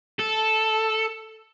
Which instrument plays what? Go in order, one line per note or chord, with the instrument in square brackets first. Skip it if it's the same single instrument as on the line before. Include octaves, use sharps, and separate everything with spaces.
[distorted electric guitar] A4